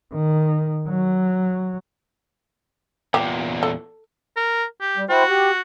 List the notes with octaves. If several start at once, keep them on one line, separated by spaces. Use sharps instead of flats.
D#3
F#3
E2 A#2 G4
A4
A#4
G4
G3
E4 F#4 C5 G5
G4